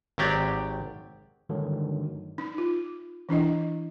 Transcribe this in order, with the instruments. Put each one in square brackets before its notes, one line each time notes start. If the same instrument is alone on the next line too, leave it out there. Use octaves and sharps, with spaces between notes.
[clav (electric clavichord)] G#1 F#3 G4 D5
[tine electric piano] G2 D3 D#3 F#3 G#3 A3
[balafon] D#4
F4
E3 D4 E4 D#5